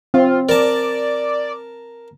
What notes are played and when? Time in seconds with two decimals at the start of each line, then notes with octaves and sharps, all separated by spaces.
0.14 C4 F4
0.49 A#4 D5 A5